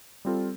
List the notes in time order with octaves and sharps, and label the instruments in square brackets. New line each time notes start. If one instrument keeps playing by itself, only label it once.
[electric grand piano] G3 C4 F4 A4